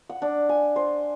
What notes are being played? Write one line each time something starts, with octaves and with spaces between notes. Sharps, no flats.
F#5
D4
G#5
C5